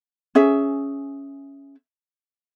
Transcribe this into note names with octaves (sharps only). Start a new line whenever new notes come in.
C#4 G#4 E5